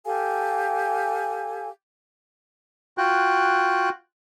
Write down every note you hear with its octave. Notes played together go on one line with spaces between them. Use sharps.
G4 A4 F5 G#5
F4 F#4 G5 F#6